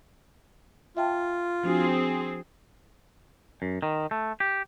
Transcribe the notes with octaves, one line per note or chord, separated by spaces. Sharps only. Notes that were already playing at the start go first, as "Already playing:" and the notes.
F4 E5 G5 A5
F3 C4 D4 F#4 G#4
F#2
D#3
A3
G4